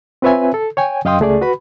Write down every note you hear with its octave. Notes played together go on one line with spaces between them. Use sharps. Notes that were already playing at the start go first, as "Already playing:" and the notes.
C4 F4 B4 C#5 E5 G#5
A4
C#5 G5 G#5
F#2 D#5 F5 G5 C6 D#6
C#2 A3 G#4 D5
F#4 B4 B5